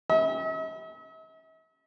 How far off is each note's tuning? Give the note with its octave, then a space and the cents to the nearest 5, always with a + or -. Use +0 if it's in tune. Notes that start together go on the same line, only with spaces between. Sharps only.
E5 -45